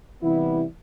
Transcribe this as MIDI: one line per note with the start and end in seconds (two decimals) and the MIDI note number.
0.23 0.65 48
0.23 0.65 52
0.23 0.65 55
0.23 0.65 59
0.23 0.65 64